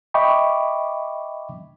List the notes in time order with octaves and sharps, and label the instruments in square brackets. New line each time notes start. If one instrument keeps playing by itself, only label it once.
[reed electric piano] D#5 E5 G5 B5 C#6 D6